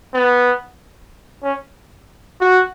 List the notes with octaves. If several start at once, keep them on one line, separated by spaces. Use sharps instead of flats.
B3
C#4
F#4